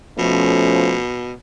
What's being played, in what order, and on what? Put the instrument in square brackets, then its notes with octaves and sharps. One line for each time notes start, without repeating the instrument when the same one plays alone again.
[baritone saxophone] B2 [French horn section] F3 A3 C#4